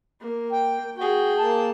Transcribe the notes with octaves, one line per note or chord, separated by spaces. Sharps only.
A#3
G5
F#4 G#4 G5
A#3 A5